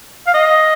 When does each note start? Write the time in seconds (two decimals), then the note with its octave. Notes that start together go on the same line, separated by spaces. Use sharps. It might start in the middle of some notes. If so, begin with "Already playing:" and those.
0.27 F5
0.34 D#5